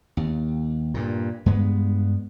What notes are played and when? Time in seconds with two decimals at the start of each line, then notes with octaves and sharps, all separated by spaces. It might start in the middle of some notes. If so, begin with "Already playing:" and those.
0.17 D#2
0.94 G2 A#2
1.46 G2 G#3 B3